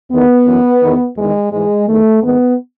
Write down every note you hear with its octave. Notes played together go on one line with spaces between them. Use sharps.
E2 D#3 B3
F#2 E3
E2 D#3
E2 D#3 G#3
G#2 E3 G#3
E2 D#3 A3
G#2 D#3 B3